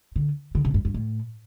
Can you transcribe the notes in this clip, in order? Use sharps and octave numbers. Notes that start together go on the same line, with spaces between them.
D3
D3
C3
G2
G2
A2